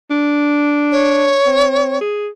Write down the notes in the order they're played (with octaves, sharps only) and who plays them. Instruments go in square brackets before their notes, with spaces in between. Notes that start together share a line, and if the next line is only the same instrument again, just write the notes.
[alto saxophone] D4
[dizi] C#5
[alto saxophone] C4
G#4